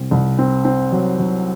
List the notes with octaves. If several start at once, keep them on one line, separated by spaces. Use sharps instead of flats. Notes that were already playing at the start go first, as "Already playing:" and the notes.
Already playing: C2 C4
C2
C4
C4
F#3
F#3